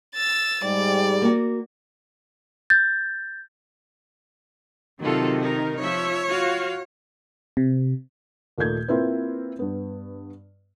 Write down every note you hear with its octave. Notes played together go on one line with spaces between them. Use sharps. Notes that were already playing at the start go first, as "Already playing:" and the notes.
E6 A6
G#2 G3 D5
A#3 F#4
G6 A6
C3 D#3 F#3 F4 A4
D#4 A#4
F3 C#5 E5
F4 F#4 F5
C3
D#2 A#2 A3 D#4 G6 G#6
A#3 C4 E4 F4 B4
G2 B3